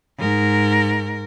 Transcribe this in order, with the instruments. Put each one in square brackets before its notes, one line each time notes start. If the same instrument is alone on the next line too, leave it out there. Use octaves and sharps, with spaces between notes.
[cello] G#2 A#4